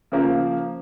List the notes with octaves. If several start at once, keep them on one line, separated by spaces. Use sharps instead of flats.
C#3 F3 A#3